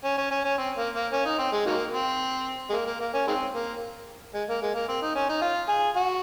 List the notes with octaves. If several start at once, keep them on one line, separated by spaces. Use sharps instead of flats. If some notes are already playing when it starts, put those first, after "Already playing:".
C#4
C#4
C#4
C#4
C4
A#3
A#3
C#4
D#4
C4
G#3
D#3 F#3 A#3
C4
G#3
A#3
A#3
A#3
C#4
D#3 G#3 C4
A#3
G#3
A#3
G#3
A#3
C4
D#4
C#4
D#4
F4
G#4
F#4